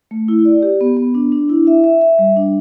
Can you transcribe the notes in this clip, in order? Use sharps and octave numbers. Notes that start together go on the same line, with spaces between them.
A3
E4
D5
G4
B3
B3
D4
D4
E4
E5
E5
E5
G3
D4